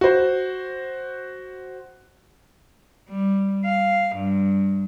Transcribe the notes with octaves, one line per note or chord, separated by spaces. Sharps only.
F#4 C5
G3
F5
G2